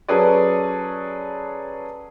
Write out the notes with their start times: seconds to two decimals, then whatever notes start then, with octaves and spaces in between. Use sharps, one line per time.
0.08 F#3 C#4 G#4 A4 B4 D5